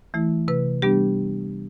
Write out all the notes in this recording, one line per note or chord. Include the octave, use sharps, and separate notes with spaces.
E3 A3 E4
C3 B4
G3 B3 D4 G4